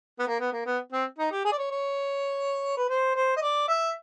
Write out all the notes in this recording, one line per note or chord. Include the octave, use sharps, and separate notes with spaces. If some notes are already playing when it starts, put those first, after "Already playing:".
B3
A#3
B3
A#3
B3
C4
D#4
G4
G#4
D5
C#5
C#5
B4
C5
C5
D#5
D5
E5